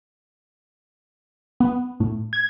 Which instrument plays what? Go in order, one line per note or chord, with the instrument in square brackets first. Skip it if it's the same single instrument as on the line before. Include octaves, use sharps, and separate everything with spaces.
[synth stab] B3
A2
G#6